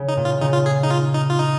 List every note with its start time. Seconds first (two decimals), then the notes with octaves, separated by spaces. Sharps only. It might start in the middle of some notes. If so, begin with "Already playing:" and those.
Already playing: C#3
0.08 D#4
0.17 A#2
0.25 F4
0.41 C#3 D#4
0.53 F4
0.66 G#4
0.83 D#4
0.90 F4
1.14 D#4
1.30 F4
1.39 D#4